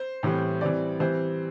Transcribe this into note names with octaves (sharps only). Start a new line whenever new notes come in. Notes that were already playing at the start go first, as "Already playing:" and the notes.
Already playing: C5
A2 E3 G3 C4
E3 G3 C4 D5
E3 G3 C4 C5